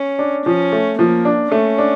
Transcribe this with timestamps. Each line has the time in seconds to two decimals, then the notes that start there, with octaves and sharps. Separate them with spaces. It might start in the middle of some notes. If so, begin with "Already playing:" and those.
Already playing: C#4
0.19 D4
0.45 F3 C#4
0.72 A3
0.98 F3 A#3
1.25 D4
1.51 A3 C#4
1.78 D4